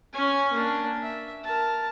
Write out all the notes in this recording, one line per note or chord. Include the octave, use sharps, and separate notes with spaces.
C#4 G#5
A#3 D4
E5
A#4 A5